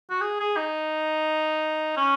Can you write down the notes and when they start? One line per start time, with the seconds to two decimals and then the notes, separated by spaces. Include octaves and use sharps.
0.10 F#4
0.21 G#4
0.40 G#4
0.57 D#4
1.97 C#4